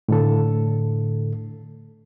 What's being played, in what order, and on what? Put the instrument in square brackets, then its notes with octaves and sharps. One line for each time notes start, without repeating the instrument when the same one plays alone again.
[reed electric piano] A2 D3 A4